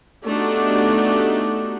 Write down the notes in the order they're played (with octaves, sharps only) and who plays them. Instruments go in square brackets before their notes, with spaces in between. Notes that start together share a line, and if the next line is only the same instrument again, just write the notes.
[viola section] A3 B3 D4 D#4 F#4 G4